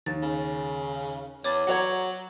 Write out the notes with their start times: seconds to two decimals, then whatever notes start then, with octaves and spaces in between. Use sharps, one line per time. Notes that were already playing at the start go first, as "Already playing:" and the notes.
0.06 D#2 A6
0.22 C#3
1.44 E2 C#5 D6 A6
1.67 F#3 F#4 C#5 F#5 A#5 G#6